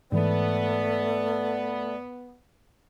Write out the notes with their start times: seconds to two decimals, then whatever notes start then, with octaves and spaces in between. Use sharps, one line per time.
0.12 G#2 E3 A3 B3 D5